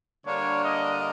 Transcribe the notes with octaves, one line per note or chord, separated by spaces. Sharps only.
D3 G3 A#3 D4 C#5
D#5